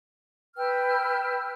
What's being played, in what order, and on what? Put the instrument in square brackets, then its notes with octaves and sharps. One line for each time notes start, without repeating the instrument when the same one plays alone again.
[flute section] B4 G5 E6 F6